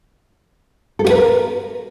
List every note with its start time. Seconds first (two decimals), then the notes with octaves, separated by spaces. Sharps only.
0.99 A4
1.05 G4
1.10 B4
1.15 A#4